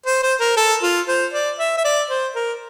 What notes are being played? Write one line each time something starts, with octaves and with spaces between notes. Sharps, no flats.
C5
C5
A#4
A4
F4
C5
D5
E5
E5
D5
C5
A#4